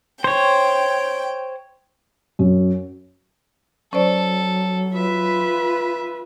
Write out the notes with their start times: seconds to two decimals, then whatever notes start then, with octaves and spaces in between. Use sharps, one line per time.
0.24 C5 C#5 G5
2.39 F#2
3.93 F#3 C#4 A4 C5 D5
4.94 F4 B4 E5